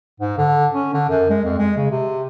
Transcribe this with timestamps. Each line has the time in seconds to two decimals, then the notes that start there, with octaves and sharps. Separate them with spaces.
0.20 G#2
0.38 D3
0.73 C#4
0.94 D3
1.09 F#2
1.30 G#3
1.45 F2
1.58 G#3
1.77 C#3
1.91 C3